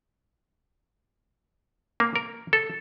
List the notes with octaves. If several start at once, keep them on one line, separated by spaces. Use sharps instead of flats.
A#3
A#4
A4